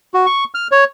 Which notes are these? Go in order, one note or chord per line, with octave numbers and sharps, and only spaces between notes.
F#4
C#6
F6
C#5